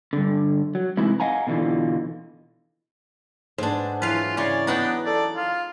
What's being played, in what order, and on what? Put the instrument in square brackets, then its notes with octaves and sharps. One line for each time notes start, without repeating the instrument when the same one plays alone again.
[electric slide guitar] G2 D3
F#3
C3 E3 G#3 D#4 E4
D#5 F5 F#5 G#5 A#5
B2 D3 E3 D#4 F4
[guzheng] G#2 D4 [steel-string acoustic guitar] B3 C5
[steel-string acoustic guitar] E3 F#3 [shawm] F4 [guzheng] B4 F5
[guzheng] C#3 C#5 C6 [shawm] D5
[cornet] B3 [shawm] D4 [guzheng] D#4 F#5 G5
[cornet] A4 [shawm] D5
[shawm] F4 [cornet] F5